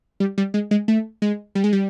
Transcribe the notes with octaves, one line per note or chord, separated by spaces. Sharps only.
G3
G3
G#3
G#3
A3
G#3
G3
G#3
G3